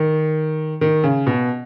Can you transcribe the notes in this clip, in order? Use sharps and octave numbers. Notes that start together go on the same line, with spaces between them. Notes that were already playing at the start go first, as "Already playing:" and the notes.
Already playing: D#3
D#3
C#3
B2